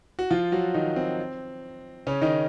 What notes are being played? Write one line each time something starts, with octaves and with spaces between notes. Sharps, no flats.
F#4
F3 F4
F#3 F#4
D#3 D#4
C4
C#3 C#4
D#3 D#4